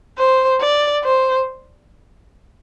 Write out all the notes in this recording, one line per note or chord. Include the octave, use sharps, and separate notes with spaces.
C5
D5
C5